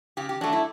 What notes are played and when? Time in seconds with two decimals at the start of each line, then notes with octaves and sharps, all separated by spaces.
0.17 C#3 G4
0.29 G4
0.41 F#3 A3 D4
0.53 E4